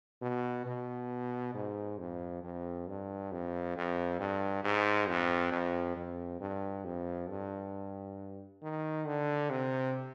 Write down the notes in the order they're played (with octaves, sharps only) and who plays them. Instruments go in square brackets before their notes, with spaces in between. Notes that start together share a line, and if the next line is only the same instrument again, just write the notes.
[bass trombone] B2
B2
G#2
F2
F2
G2
F2
F2
G2
G#2
F2
F2
F2
G2
F2
G2
D#3
D3
C3